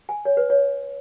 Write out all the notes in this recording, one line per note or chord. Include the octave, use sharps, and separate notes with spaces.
G#5
C#5
B4
C#5